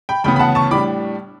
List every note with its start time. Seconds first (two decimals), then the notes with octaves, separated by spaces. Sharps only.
0.09 G5 B5
0.24 D2 C#3 E3 B3 G5 B5
0.36 B5
0.39 F#5 A5
0.55 A5 C#6
0.71 A2 G3 D4 B5 D6